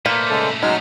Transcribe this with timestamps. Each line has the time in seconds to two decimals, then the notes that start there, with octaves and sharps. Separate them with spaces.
0.06 A#2 A3 A#3 B4 C5 D5
0.30 C#3 G#3 A4
0.63 F#3 G#3 C#4 D#4 F6